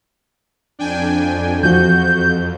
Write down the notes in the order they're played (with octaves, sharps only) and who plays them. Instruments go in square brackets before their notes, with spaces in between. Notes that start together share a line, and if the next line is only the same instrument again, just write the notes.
[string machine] F2 [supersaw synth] D4 G5 G#5
[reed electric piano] E2 F3 [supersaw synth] F#4 [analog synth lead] G6